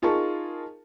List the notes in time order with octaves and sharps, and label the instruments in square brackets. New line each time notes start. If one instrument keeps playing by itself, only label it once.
[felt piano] D#4 F4 G#4 A#4 A5 C#6